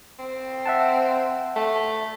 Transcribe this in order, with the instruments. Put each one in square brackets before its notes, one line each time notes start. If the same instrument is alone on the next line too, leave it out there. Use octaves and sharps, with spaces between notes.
[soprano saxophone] C4
[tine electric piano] E5 F#5 A5
[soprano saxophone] A3